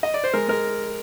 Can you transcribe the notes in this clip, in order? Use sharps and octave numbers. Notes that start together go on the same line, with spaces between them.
D#5
D5
C5
G#3 A#4
G#3 A#4